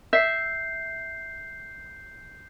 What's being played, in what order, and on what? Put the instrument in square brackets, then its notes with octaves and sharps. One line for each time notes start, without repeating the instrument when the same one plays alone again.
[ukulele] E5 [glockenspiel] G6 C7